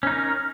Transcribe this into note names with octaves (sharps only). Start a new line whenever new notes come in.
C#4 D#4 A#4